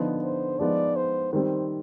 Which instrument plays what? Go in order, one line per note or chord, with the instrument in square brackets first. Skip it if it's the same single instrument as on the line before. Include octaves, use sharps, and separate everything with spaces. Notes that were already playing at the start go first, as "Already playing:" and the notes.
Already playing: [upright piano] D3 F3 B3 D#4
[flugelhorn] C5
[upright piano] F3 G#3 B3 D#4 [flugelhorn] D5
[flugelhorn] C5
[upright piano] D#3 G3 C4 [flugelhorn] C5